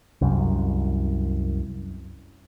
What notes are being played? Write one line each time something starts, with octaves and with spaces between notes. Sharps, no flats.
C2 F#2